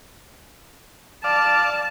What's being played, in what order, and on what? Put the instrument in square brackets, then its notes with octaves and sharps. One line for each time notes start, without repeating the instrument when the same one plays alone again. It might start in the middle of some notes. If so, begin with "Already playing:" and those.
[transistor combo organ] D5 F5 [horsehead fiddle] A5